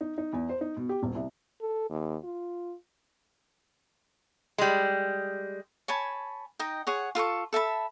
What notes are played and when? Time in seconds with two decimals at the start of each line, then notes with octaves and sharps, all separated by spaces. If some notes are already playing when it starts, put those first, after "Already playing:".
0.01 D#4
0.18 D#4
0.33 E2
0.49 C5
0.61 D#4
0.77 B2
0.89 G4
1.03 D#1
1.15 C2
1.61 A4
1.90 D#2
2.24 F4
4.58 G3 G#3
5.88 C#5 G#5 A5 B5
6.59 D#4 D#5 G5
6.87 G#4 C#5 F#5
7.15 F4 A4 A#5 C#6
7.53 A4 E5 A5 B5